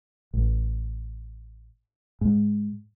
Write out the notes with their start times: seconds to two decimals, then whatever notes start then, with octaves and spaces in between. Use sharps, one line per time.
0.33 A1
2.21 G#2